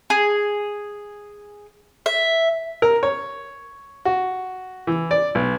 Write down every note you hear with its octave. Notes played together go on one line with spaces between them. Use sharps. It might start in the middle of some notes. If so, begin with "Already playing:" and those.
G#4
E5
A#4
C#5
F#4
E3
D5
B1